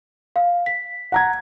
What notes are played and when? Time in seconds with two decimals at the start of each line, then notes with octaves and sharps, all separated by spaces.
0.36 F5
0.66 B6
1.12 F#5 A#5 G#6